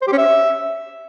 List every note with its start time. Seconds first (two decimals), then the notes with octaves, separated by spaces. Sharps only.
0.02 C5
0.07 G4
0.13 C#4
0.18 E5